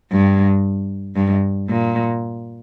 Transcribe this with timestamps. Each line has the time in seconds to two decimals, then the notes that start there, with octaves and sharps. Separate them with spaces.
0.12 G2
1.16 G2
1.69 A#2